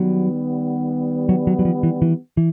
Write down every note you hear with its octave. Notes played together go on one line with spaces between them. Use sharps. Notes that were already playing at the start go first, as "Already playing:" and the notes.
Already playing: D#3 F#3 G3 B3
F#3
F#3
F#3
F3
E3
E3
E3